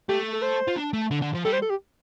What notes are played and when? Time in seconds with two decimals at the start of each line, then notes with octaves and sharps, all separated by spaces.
0.09 A3 G4
0.33 A4
0.42 C5
0.68 F4
0.76 D4
0.93 A3
1.11 D3
1.22 D3
1.34 F3
1.45 G3 A4
1.53 C5
1.62 A4
1.70 G4